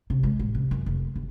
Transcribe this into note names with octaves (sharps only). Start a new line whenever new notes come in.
C3
G#3
A1
C3
F#2
F1
G1